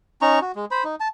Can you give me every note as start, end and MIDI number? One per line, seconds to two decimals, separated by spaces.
0.22 0.39 61
0.22 0.39 63
0.22 0.39 82
0.22 0.39 85
0.42 0.52 66
0.55 0.65 56
0.71 0.84 72
0.71 0.84 83
0.84 0.95 63
1.00 1.08 81